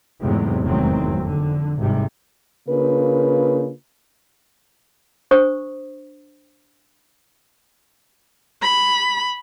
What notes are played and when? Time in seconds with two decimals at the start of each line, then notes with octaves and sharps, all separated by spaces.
0.22 E2 G#2 C3 F#3 G#3 A3
0.63 F1 E2 G#2 D#3 F#3 C4
1.19 F2 D3
1.78 G#1 A2 C3 G3 G#3
2.69 C#3 A#3 D4 F4 A#4 B4
5.31 D4 C5 C#6 D#6
8.62 B5